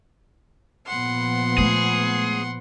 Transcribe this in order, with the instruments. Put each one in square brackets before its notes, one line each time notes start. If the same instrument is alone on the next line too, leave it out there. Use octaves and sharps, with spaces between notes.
[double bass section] A#2 F3 B3 [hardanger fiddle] F#5 C6
[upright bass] G#3 A3 [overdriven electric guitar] G#4